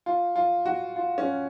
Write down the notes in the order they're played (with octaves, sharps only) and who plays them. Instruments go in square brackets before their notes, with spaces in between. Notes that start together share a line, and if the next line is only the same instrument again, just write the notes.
[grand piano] F4
F4
F#4
F4
C#4